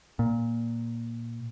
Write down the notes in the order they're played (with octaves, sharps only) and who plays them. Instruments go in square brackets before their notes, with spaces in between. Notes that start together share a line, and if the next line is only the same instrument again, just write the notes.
[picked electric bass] A#2